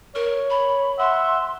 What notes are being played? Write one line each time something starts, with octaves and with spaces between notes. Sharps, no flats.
A#4 C#5
B5
E5 F#5 C6